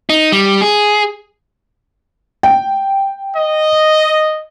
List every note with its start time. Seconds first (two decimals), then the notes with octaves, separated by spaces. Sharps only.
0.10 D#4
0.32 G3
0.61 G#4
2.43 G5
3.36 D#5